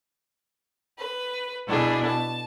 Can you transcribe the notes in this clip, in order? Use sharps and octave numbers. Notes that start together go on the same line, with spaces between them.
B4
B2 D4 E4 G#4
A5